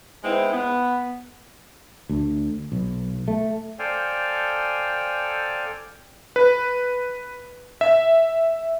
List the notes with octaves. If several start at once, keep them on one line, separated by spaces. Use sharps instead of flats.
G#3 B3 C4 D#4 E4
B3
D2
B1
A3
A4 C5 D5 F5 G5 G#5
B4
E5